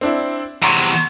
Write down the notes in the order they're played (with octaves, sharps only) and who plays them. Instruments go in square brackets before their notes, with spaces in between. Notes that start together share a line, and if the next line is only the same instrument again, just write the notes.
[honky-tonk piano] C4 D4 E4
[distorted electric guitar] E2 C3 [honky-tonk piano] A#5 C6 C#6